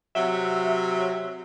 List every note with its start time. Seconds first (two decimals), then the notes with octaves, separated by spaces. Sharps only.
0.15 C3 F#3 E5